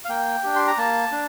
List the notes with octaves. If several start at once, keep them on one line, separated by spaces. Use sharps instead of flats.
F5
A#3 G5
D4 G4
C6
A#5
A#3 A5
D4